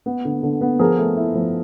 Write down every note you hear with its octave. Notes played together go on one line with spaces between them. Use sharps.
B3
D3
D3
B3
F3 G#4 A#4
A3
E4
F3